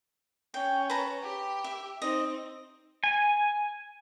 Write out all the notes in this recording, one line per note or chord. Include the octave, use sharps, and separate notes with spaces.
C#4 G5
B4 A5 A#5
G4
E5
C4 D#4 D#5
G#5